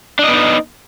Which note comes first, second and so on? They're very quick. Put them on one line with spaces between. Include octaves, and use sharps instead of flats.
D4 D#5 B3 D#4